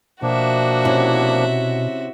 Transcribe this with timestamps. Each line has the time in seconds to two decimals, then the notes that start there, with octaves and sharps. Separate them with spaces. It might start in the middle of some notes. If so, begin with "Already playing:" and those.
0.22 B2 F3 A#3 D4 F#4 E5
0.85 C3 C#4 E4